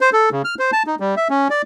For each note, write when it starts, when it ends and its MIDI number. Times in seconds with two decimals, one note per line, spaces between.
0.01 0.10 72
0.13 0.29 69
0.32 0.42 49
0.45 0.55 89
0.59 0.71 72
0.73 0.83 81
0.87 0.95 63
1.00 1.15 55
1.17 1.28 76
1.30 1.48 61
1.50 1.62 74